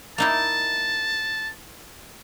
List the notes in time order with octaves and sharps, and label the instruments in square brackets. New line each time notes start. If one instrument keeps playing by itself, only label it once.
[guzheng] A#3 D#4 E4 [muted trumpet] A5